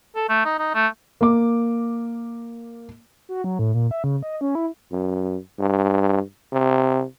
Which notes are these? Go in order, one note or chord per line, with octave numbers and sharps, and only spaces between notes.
A4
A3
D#4
D#4
A3
A#3 D6
F#4
F#3
A2
A#2
E5
C#3
D#5
C#4
E4
F#2
G2
C3